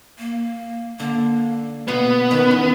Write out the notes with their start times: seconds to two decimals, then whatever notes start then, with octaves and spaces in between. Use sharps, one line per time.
0.19 A#3
0.99 D3 A#3 D4
1.88 B2 A#3 B3 F#4 F5
2.31 D#3 C#4 F#4 B4
2.51 E2